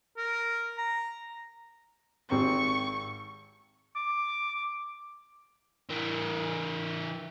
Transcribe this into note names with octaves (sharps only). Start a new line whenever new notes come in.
A#4
A#5
G#1 C4 G4 C#6
D6
E3 A#4